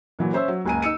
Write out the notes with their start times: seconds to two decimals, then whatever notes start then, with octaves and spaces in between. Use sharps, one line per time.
0.19 A#2 E3 F#3
0.33 C#4 C5 E5 E6
0.48 F#3
0.65 F#1 C#2 C#3 G#5 A#5 D#7
0.82 D#4 E6 C#7 D#7